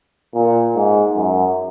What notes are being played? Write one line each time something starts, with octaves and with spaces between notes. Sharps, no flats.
A#2
G#2
F#2